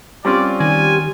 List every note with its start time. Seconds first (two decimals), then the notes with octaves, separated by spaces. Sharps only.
0.25 G3 C4 C#4 F4 D5
0.60 D#3 G#5